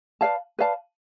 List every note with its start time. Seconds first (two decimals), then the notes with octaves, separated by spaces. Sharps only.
0.21 B4 D5 F5 A5
0.59 B4 D5 F5 A5